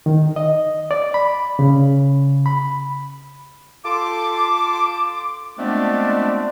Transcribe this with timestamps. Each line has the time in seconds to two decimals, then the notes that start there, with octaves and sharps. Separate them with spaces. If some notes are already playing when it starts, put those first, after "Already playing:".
0.06 D#3
0.36 D#5
0.91 D5
1.14 B5
1.59 C#3
2.46 B5
3.84 F4 A4 A5 C6 D6
5.58 F3 G#3 A3 B3 C4 D4